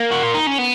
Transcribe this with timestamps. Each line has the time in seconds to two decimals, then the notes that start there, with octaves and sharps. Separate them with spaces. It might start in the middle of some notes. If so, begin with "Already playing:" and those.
Already playing: A#3
0.11 F#4
0.23 F4
0.34 D#4
0.47 C#4
0.58 B3